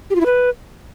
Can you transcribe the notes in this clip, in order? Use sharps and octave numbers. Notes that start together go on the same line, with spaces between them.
G4
F4
E4
B4